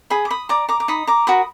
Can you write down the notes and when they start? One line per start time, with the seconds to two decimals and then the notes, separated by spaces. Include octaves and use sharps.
0.10 G#4 B5 D#6
0.25 D6
0.30 B5 D#6
0.49 D5 A#5 D6
0.69 A#5 D6
0.80 D6
0.88 D#4 B5 D#6
1.07 A#5 D6
1.27 F#4 A#4 B5 D#6